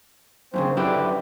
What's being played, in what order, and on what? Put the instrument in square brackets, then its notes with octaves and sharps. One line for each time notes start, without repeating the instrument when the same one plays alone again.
[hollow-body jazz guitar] F#2 A2 C#3 [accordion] A#3 C4 C5
[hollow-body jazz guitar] F#2 E4 G4 [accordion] D3 B4